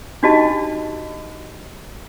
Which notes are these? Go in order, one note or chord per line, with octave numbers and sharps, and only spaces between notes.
D4 D#4 F#4 G4 D#5 A5